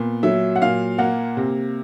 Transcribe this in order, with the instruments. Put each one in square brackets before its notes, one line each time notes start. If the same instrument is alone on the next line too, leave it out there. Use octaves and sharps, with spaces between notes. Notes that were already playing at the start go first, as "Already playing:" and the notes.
Already playing: [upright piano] A#2 B3
F#3 E5
F#5
A#2 F5
A#3 F#5
C3